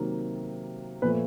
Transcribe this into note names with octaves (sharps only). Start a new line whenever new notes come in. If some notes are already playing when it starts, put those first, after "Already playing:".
Already playing: C3 D#3 F#3 A#3
A#2 F3 A3 B4